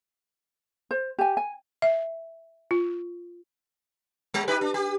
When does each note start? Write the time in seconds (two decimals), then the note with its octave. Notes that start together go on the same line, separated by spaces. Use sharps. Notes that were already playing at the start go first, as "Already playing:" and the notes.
0.91 C5
1.19 G4 G#5
1.37 G#5
1.82 E5
2.71 F4
4.34 G3
4.48 D#4 G4 B4
4.61 D4
4.74 G4